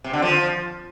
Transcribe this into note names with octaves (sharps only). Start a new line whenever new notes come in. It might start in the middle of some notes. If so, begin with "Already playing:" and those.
C3
D3
F3